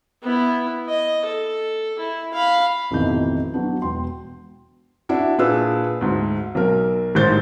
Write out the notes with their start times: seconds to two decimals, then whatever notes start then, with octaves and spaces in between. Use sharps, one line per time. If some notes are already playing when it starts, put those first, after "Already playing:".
0.22 B3 E4
0.88 D#5
1.25 A4
1.99 E4
2.34 F5 B5
2.91 A1 F2 B2 D#3 E4 G6
3.54 F#3 B3 D4
3.82 E1 G5 C6
5.09 D4 E4 F#4
5.38 A#2 D4 G#4 B4 E6
6.01 D2 G#2
6.55 B1 A#4
7.15 A1 G#2 D#3 C5 G6 A6